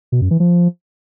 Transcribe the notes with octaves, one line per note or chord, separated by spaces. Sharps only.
B2
F#2
E3
F3